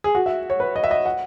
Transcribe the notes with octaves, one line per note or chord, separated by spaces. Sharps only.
G#4
F#4
E5
C#5
B4
D#5
E5
D#5
F#5